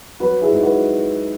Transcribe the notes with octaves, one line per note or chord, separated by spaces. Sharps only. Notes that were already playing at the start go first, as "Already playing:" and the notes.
F#3 F#4 B4
E4 G#4
G#2
F#4 B4